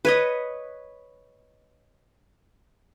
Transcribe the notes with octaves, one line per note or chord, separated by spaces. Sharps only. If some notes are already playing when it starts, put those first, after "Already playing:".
B4 C#5 D#5